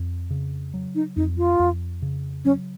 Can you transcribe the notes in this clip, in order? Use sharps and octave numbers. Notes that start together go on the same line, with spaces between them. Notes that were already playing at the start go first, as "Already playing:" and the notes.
Already playing: F2
C#3
F#3
D#4
F2 D#4
F4
F2
C#3
F#3 C#4